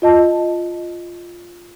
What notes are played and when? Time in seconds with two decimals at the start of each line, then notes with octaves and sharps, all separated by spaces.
0.02 F4 D#5 A5